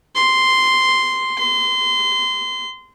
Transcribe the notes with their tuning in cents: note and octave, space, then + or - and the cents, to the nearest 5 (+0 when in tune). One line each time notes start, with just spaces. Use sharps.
C6 -5
C6 -25